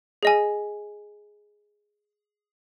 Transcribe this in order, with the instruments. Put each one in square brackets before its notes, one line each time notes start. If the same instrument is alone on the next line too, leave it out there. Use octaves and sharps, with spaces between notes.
[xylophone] G#4 D#5 G#5